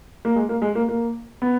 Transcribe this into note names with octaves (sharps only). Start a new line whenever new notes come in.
A#3
G#3
A#3
G#3
A#3
A#3
B3